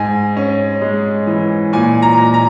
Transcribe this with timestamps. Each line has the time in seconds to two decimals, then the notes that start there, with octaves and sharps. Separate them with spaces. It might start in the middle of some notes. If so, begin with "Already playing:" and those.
Already playing: G#2 G#5
0.37 C#4
0.81 G#3
1.27 E3
1.73 A#2 G#5
2.02 A#5
2.17 A#2
2.34 A#5